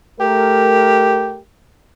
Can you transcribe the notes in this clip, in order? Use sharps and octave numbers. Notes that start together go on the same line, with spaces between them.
A3 G4 A#4